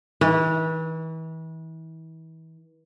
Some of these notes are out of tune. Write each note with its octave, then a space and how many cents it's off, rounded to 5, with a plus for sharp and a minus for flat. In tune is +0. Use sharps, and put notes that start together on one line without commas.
E3 -35